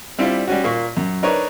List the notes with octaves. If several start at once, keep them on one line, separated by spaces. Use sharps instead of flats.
G3 C4 D4 E4 F4
G3 C#4 F#4
A#2 A#3 C#6
F#2
D4 D#4 A#4 B4 C#5